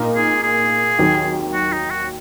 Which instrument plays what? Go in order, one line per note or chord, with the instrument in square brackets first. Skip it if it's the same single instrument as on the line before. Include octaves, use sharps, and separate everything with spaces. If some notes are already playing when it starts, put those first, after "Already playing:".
Already playing: [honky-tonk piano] A#2 A#3 D#4 A#4
[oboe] G#4
G#4
[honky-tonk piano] D#2 D#3 F#3
[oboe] F#4
D#4
F#4